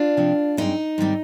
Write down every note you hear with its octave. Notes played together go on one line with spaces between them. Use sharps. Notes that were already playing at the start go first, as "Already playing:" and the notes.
Already playing: D4 F4
C3 F3 C4
G2 F3 G#3 C4 D#4
G#2 D#3 G3 C4